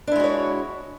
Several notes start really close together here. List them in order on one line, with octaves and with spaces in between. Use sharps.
D4 E4 G#3 F#4 C#5